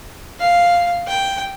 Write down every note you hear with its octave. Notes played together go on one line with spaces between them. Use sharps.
F5
G5